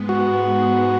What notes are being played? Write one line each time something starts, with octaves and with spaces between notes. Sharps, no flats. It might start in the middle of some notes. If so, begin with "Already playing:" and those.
Already playing: G#2 G#3 B3
F#4